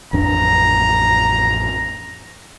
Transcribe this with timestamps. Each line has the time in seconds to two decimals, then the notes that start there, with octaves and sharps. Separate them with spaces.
0.13 A1 F2 D4 A#5